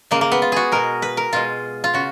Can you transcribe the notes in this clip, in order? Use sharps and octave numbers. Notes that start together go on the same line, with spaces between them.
C#3 G#3 A#3
A#3
B3
F4
F#4 G#4
B2 G#3 A#4
B4
A#4
B2 G#3 F4
F4
C#3 F#4